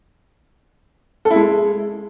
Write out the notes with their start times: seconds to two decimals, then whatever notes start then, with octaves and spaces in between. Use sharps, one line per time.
1.25 A4
1.31 E4
1.36 G#3